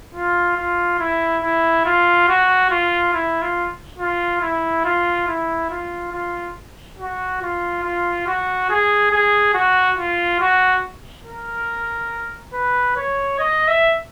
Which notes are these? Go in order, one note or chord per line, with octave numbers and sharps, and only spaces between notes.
F4
F4
E4
E4
F4
F#4
F4
E4
F4
F4
E4
F4
E4
F4
F4
F#4
F4
F4
F#4
G#4
G#4
F#4
F4
F#4
A#4
B4
C#5
D#5
E5